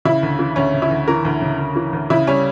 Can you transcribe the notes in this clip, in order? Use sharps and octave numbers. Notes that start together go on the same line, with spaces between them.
C#3 E4
D2
E3
D2 C#4
C#3
E4
D2
E3 A#4
D2
C#3
D2
E3
D2
C#3 E4
G3 C#4